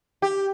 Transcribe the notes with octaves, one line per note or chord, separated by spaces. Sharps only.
G4